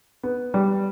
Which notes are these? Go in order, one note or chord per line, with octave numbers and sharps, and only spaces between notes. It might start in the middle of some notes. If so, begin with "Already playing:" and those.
B3
G3